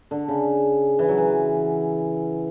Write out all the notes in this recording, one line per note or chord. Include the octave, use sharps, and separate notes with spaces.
D3
C#3
E3
F#3
E3